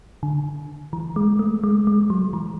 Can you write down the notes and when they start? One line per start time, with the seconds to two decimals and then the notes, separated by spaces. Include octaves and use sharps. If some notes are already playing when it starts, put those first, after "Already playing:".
0.23 D3
0.93 E3
1.16 G#3
1.39 A3
1.64 G#3
1.87 G#3
2.10 F#3
2.33 E3